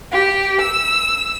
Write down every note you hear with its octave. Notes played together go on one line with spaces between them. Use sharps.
G4
E6